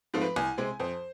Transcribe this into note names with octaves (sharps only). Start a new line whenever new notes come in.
G#2 F3 A3 C4
B4
C2 G#5
C3 G#3 C4
F2 C5